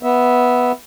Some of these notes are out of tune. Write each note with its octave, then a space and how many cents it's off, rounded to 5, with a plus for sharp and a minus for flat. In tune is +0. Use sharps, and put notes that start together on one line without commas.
B3 +0 E5 -10